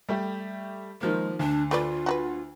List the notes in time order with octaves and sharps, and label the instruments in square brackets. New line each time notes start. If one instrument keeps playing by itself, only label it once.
[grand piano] G3 A3 G4
[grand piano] D#3 F3 A#3 [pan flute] G#3
[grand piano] D2 [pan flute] D4
[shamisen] A3 B4 D5 [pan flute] F4
[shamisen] F#4 G#4 B4